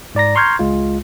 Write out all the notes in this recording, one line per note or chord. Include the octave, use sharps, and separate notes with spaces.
G#2 D5 A#5 A#6
A#5 C6 C#6 F6 G6 G#6
C#2 G#3 F4